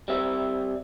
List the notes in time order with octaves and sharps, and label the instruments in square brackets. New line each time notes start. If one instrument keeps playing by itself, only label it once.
[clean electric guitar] G3 C4 E5